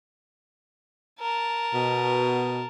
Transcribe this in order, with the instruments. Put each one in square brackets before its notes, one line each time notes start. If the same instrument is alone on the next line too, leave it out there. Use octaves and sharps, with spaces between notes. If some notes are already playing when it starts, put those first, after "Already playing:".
[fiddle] A#4 A5
[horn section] B2